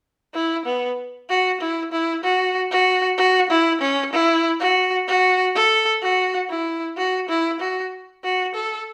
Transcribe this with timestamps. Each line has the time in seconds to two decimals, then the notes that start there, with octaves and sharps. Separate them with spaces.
0.34 E4
0.65 B3
1.29 F#4
1.61 E4
1.92 E4
2.24 F#4
2.71 F#4
3.18 F#4
3.50 E4
3.81 C#4
4.13 E4
4.60 F#4
5.08 F#4
5.55 A4
6.02 F#4
6.50 E4
6.97 F#4
7.29 E4
7.60 F#4
8.24 F#4
8.55 A4